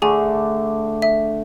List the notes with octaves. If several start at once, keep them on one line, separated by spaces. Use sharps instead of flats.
D3 A3 D4 G#4 G#5
E5